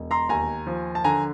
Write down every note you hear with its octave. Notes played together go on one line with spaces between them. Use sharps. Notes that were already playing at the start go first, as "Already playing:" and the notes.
Already playing: E1
A#5 C6
D#2 G#5 A#5
F3
A5
D3 G#5 A#5